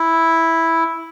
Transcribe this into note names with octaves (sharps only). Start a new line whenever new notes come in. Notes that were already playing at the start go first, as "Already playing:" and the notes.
Already playing: E4